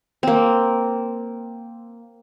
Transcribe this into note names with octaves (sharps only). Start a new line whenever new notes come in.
A#3 C4